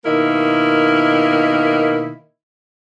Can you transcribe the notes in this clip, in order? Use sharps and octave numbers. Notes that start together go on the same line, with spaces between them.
B2 D#3 A#3 E4 A#4